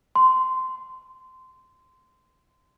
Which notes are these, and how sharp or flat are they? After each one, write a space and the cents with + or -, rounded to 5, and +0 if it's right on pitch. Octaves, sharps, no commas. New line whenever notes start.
C6 -15